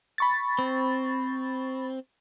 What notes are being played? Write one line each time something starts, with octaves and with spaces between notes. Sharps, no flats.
B5 C#6 A6
C4